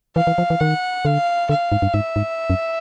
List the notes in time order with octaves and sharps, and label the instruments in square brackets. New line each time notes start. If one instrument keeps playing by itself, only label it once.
[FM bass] E3 [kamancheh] F5
[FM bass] E3
F3
E3
[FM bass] D#3 [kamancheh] F#5
[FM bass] D3 [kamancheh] F5
[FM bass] D3 [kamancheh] F5
[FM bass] G#2
G2
[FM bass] G#2 [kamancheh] E5
[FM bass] G#2
F#2